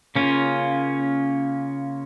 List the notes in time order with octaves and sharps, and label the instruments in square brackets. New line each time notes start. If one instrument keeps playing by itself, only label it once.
[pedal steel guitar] C#3 A#3 C#4 F4